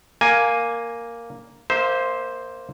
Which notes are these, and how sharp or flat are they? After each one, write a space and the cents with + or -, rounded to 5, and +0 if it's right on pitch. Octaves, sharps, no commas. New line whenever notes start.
A#3 +0 G#5 +0
A#3 +0 C5 +0 E5 -35